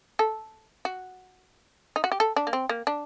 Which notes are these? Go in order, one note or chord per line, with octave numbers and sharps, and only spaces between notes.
A4
F#4
D#4
F#4
G4
A4
D4
A#3
C4
A#3
D4